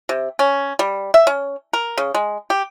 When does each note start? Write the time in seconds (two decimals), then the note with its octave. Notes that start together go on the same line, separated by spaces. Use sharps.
0.09 C3
0.39 C#4
0.79 G3
1.14 E5
1.27 C#4
1.73 A#4
1.98 C#3
2.15 G#3
2.50 G4